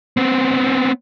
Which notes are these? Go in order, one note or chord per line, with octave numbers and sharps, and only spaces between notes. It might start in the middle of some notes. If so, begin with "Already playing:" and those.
B3 C4